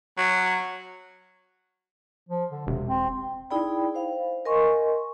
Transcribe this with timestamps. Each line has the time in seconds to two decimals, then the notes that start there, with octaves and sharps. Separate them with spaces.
0.18 F#3
2.29 F3
2.51 D3
2.67 E1 C3
2.88 C4
3.51 D#4 E4 G#4 D5 G5 B5
3.95 C5 F5
4.45 A#4 D#5 G#5 C6 C#6